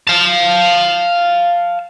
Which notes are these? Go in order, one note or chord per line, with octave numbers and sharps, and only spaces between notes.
F5 A5